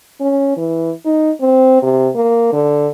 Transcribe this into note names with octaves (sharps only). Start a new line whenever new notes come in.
C#4
E3
D#4
C4
C3
A#3
D3